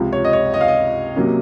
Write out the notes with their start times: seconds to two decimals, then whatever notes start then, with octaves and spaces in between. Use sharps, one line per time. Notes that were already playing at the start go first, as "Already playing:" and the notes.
Already playing: C#2 C3 F3
0.13 C#5
0.24 D#5
0.33 C#5
0.54 D#5
0.61 F5
0.68 D#5
1.15 C3 F#3 A#3 C#4